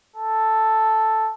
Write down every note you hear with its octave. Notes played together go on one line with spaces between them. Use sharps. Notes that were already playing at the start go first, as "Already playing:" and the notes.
A4